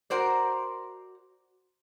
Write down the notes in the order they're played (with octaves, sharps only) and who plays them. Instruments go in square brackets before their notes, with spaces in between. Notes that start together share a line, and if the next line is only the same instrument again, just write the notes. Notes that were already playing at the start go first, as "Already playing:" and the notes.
[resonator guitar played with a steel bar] F#4 A#4 C5 D5